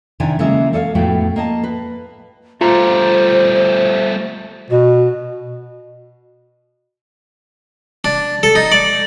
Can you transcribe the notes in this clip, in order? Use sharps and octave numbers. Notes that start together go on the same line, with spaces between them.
C3 D#3 D4 E4 G#5
C#3 E3 G#3 A#3 E5
A4 C#5 D#5 F5
F2 A2 A3 B3 F#4 G5
A#3 D#5 A5
B4
G3 A3 F4 C5 A#5
B2 F#4
D4
A4
D#4
D5